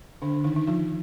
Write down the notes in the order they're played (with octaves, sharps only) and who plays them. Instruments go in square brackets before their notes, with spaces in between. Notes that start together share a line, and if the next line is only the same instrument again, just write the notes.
[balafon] D3 D4
D#3 D#4
D#4
F3 F4